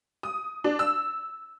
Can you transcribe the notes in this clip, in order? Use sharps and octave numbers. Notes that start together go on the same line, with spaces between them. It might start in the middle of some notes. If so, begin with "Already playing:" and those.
D#6
D4
E6